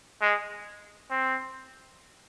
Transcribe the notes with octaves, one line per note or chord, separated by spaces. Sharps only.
G#3
C4